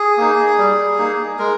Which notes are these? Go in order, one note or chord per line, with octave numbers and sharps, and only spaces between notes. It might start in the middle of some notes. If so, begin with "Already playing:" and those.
Already playing: G#4
A#3 D#4
G3
A#3 D#4
G#3 A#4